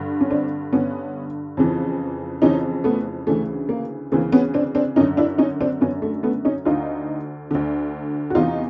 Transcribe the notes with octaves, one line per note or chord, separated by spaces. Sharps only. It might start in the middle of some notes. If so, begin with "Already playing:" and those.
Already playing: G2 D3
C#4
C4 D4
G2 D3 B3 C#4
F2 C#3 E3
F2 C#3 E3 C#4 D#4
A3 B3
D2 C#3 E3 A3
A#3
D2 C#3 E3 A#3 C4
B3 C#4
C4 D4
C4 D4
F#2 D3 C#4 D#4
D4 E4
C#4 D#4
C4 D4
F#2 D3 B3 C#4
A3
A3 B3
C#4 D#4
D2 D3 D#4 F4
D2 D3
F#4
E2 C3 E3 D#4 F4